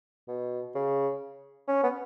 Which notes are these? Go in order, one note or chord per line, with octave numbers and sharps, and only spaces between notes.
B2
C#3
C#4
B3